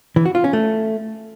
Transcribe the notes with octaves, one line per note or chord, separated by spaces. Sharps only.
E3
F#4
F4
C#4
A3